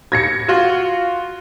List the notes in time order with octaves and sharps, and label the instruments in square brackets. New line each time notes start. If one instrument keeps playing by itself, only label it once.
[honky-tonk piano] G#6 A#6 C#7
[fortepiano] F4 F#4